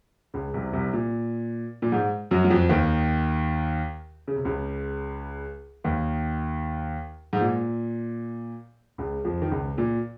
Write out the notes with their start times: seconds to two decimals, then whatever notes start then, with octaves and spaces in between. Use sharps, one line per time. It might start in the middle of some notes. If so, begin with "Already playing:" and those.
0.34 C#2 C#3
0.54 C2 C3
0.73 C2 C3
0.93 A#2
1.82 A#2
1.92 G#2
2.31 F#2 F#3
2.45 F#3
2.50 F2 F3
2.69 D#2 D#3
4.28 C#3
4.36 C3
4.45 C#2 C#3
5.84 D#2 D#3
7.33 G#2
7.41 A#2
8.98 C#2 C#3
9.25 F2 F3
9.42 D#3
9.51 C#2 C#3
9.78 A#2